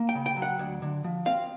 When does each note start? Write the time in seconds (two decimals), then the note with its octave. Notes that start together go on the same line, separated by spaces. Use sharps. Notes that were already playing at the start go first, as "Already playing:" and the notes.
Already playing: A#3
0.09 G5
0.15 C#3
0.26 G5
0.37 F#3
0.42 F#5
0.59 D2
0.82 D3
1.04 F3
1.26 C4 F5